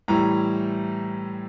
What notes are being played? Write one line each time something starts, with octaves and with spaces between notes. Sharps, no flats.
A2 E3 G3 A#5